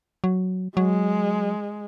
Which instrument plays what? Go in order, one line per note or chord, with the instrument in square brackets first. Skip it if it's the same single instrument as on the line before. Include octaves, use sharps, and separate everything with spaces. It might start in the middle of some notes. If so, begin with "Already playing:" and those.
[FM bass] F#3
[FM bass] F#3 [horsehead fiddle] G#3